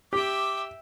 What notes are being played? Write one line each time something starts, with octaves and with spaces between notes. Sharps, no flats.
G4 E5 G5 D6